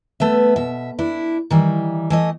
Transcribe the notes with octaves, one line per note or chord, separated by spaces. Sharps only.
A3 B3 E5
B2 E5
D4 E4
D#3 E3 G3
E3 A3 D#5